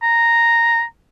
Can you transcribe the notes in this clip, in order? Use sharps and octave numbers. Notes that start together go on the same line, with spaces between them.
A#5